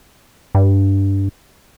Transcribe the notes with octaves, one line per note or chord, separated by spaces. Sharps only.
G2